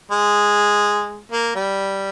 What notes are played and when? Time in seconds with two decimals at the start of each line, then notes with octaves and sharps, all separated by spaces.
0.11 G#3
1.32 A#3
1.55 G3